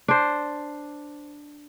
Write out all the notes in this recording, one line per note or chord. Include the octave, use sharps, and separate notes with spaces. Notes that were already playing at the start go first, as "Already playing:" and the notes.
D4 C5